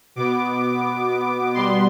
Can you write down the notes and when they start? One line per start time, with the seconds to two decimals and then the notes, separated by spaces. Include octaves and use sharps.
0.16 B2 B3 D6
1.54 B2 G3 B3 C6